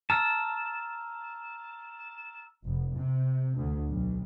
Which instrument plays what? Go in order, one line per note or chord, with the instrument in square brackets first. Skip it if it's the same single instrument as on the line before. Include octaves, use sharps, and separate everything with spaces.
[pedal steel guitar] A5 [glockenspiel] A#5 E6 F6
[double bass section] F1
C3
D2
B1